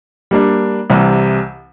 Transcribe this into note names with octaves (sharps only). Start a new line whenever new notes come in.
G3 A#3 D4
C2 C3 E3 G3